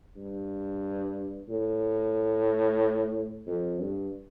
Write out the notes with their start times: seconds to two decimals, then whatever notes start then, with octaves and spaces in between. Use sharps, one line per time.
0.17 G2
1.49 A2
3.47 F2
3.80 G2